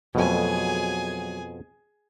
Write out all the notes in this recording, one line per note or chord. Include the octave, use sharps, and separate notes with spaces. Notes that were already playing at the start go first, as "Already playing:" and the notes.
F2 B2 F#3 A3 G#4 G#5